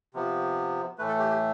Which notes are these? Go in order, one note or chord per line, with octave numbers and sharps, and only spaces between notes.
C3 F3 B3
A2 E3 A3 B4
A4
G4
G4